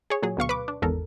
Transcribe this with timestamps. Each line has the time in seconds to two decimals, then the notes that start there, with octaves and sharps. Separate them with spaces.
0.10 G#4 C#5
0.22 A#2 F#3 G#4
0.37 D2 B2 F5 C#6
0.49 B4 D6
0.68 D4
0.82 G#1 E2 A4 A#4